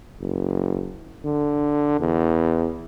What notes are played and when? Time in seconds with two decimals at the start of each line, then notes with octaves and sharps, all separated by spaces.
0.21 F#1
1.25 D3
2.00 E2